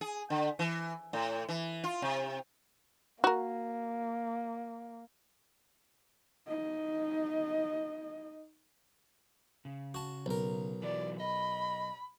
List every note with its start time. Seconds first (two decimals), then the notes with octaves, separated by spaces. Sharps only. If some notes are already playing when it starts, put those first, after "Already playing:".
0.01 G#4
0.30 D3
0.59 E3
1.13 A2
1.49 E3
1.84 F4
2.02 C3
3.24 A#3 F#4 A#4
6.48 D#4 D#5
9.65 C#3
9.94 F#4 A5
10.26 B1 A#4
10.83 E3 F#3 D5
11.20 D#5 B5